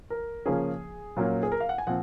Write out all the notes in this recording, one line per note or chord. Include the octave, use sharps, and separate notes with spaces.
A#4
C#3 F3 A#3 C#4 G#4
A#2 F#3 A#3 C#4
G#4
A#4
F5
F#5
G#5
A#2 F3 C4 F#5